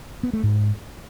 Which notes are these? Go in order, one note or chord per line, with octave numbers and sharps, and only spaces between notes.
B3
A3
G#2